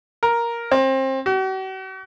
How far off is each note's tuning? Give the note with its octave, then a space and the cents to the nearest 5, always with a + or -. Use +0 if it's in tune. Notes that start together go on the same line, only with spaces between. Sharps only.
A#4 +5
C4 +30
F#4 +45